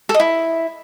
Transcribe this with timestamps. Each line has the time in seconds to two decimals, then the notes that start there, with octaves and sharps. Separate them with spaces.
0.09 A4
0.14 D#5
0.20 E4